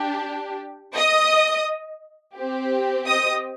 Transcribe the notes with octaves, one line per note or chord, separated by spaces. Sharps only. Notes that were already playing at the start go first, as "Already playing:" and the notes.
Already playing: D4 G4
D#5 D#6
C4 G4
D#5 D#6